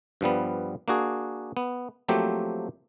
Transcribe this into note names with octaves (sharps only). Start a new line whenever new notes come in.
G2 F3 G3 B3
A#3 D4 F#4 G#4
B3
F3 F#3 A3 A#3 C4 G4